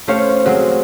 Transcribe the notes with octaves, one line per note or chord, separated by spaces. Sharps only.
A3 C#4 G4 C5 C#5 F5
F#3 G#3 C4 C#4 F#4